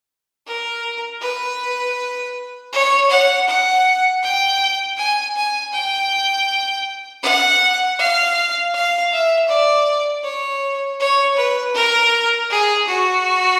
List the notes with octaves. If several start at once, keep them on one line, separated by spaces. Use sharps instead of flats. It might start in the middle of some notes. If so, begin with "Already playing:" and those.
A#4
B4
C#5
F#5
F#5
G5
G#5
G#5
G5
F#5
F5
F5
E5
D5
C#5
C#5
B4
A#4
G#4
F#4